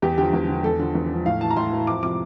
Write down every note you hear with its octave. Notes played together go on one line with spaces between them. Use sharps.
E2 G4
D3 F3 G4
E2
D3 F3
E2 A4
D3 F3
E2
D3 F3
A2 F5
E3 A5
A#5
A2 C6
E3
F2 D6
C3 F3 D6